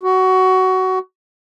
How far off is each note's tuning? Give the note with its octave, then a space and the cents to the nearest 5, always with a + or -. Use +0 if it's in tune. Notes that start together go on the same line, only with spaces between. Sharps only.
F#4 +15